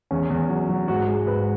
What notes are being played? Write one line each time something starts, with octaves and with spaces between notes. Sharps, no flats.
E2 C#4
E2
F#3
F#3
G#2 F#4
G#3
G#2 B4